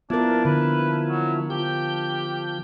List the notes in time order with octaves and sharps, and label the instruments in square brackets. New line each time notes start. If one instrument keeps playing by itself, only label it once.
[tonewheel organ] F3 E4 [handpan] B3 A#4 [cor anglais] D4
[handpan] D3 [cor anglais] B4
[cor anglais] F#3
[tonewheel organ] F3 G6 [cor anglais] G4